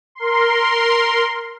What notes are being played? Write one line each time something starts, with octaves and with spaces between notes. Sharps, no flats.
A#4 C6